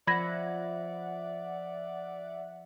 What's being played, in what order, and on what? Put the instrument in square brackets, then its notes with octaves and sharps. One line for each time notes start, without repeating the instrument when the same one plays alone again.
[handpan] F3 [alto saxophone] D5 [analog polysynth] E5 F#5 [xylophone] B5 G#6 A#6